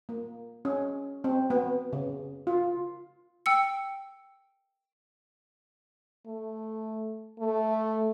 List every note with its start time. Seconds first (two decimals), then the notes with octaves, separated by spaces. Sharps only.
0.09 A#3
0.65 C#4
1.24 C4
1.50 B3
1.93 C#3
2.47 F4
3.46 G5 E6 C#7
6.26 A3
7.40 A3